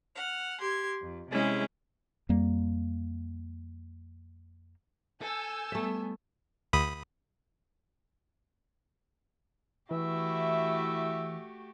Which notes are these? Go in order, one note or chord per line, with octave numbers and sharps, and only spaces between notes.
F#5 F6
G4 C6 G#6
F2
C3 G#3 C#4 E4 G#4
F2 G3 A#3
A4 G#5 E6 G6
G3 A3 B3 E5
D2 B5 D#6
E3 A3 E4 F#4 G4 E5